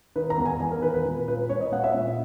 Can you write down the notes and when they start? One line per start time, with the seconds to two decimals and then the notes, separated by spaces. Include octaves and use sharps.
0.16 D#3 B4
0.30 A#5
0.38 E2
0.45 G#5
0.60 E2 G#5
0.72 A#4
0.82 D#3 B4
0.94 B4
1.05 A#2
1.28 A#2 B4
1.49 A#2 C#5
1.61 D#5
1.72 A#2 F#5
1.84 E5
1.94 A#2